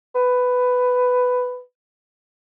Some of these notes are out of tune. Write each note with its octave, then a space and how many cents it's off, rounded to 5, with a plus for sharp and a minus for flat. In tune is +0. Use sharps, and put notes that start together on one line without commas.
B4 +10